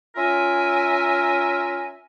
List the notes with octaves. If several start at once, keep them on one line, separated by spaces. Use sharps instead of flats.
C#4 F4 A#4 E5 G#5